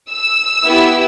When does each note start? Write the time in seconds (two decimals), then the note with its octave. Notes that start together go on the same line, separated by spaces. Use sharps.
0.11 E6
0.65 B3 E4 G4